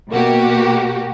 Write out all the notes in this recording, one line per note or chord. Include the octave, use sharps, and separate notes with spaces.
B2 A#3 F#4 G4